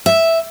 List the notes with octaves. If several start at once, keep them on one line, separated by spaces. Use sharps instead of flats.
E5